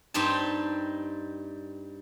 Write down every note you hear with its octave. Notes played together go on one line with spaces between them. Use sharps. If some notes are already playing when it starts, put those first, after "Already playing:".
G2 G3 C4 D#4 A5